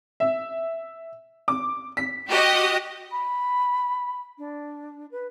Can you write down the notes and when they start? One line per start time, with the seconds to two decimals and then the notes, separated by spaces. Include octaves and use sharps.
0.20 E5
1.48 D6
1.97 B6
2.29 F#4 G4 D#5
3.11 B5
4.38 D4
5.11 B4